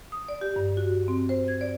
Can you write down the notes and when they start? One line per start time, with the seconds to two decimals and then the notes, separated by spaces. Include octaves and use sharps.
0.12 D#6
0.28 D5
0.41 G4
0.56 G2
0.77 F#4
1.08 C4
1.29 C5
1.48 G#6
1.61 D5